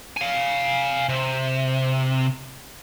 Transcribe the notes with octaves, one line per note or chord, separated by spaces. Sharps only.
F5 G#5
C3